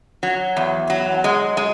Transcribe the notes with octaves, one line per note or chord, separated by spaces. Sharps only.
F#3
E2
F#3
G#3
G#3